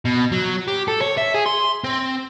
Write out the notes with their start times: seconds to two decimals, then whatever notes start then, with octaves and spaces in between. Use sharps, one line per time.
0.05 B2
0.32 F#3
0.68 G4
0.88 A4
1.02 C#5
1.18 E5
1.34 G#4
1.46 C6
1.84 C4